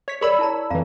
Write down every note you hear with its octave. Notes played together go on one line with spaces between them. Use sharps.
C#5 B6
G#4 A#4 C#5 D5 B5 E6
E4 A5 A#5
F2 E3 F5 A#5